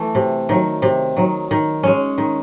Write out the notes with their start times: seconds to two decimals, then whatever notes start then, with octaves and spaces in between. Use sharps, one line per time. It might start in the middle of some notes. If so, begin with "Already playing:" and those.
Already playing: E3 A3
0.15 C3
0.49 D#3 F#3
0.82 C3
1.16 D#3 F#3
1.51 D#3
1.83 G#3 C#4
2.18 D#3